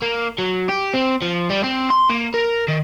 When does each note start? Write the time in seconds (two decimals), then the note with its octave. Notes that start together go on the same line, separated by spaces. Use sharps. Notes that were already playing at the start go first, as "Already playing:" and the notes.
0.02 A#3
0.38 F#3
0.69 G4
0.94 C4
1.22 F3
1.50 G3
1.64 C4
1.90 C6
2.10 A#3
2.34 A#4
2.68 D#3